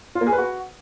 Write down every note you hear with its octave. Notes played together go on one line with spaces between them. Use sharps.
F4
A#3
G#4
B4
F#4